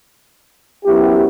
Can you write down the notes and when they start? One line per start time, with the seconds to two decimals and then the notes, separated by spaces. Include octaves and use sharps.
0.85 F#2 F#3 B3 E4 G4